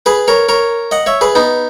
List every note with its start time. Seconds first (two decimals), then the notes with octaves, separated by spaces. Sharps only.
0.06 G#4 B4
0.28 A#4 C#5
0.49 A#4 C#5
0.91 D#5 F#5
1.06 C#5 E5
1.21 G#4 B4
1.35 B3 D#4